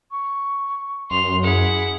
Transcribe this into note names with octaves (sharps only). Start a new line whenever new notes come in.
C#6
F#2 C6 F7
E4 G#4 F#5